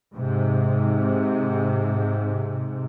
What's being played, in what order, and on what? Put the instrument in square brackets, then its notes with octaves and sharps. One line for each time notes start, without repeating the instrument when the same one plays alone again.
[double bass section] G#2 C3